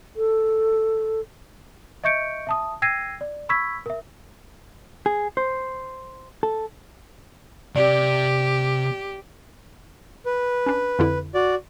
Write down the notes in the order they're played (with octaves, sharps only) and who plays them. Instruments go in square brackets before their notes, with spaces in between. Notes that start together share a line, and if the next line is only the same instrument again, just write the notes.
[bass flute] A4
[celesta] D#5 E5 C#6 G6 C#7 D7
E5 A5 D#6
G5 E6 G#6 A#6 C7 D#7
D5
B5 C#6 E6 G#6 B6
A#4 E5
[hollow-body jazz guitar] G#4
C5
A4
[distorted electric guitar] C3 [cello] G4 [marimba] D5
[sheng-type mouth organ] B4
[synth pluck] C#4 D4
F2 D3 E4
[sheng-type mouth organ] F#4 D5